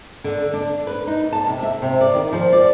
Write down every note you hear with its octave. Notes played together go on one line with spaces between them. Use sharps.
D3
D4
B4
D#4
A5
C3
E5
C3
D5
D#3
F3
D5